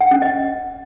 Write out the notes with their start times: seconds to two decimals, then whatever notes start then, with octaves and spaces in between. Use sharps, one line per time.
0.01 F#5
0.11 C#4
0.22 D#5